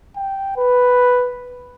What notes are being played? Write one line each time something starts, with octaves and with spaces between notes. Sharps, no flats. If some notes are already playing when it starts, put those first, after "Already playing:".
G5
B4